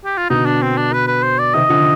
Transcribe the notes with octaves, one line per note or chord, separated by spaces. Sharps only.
G4
F4
B2 D3 D#4
D4
C4
D4
B4
B4
C5
D5
C3 D#3 D#5
D3 F3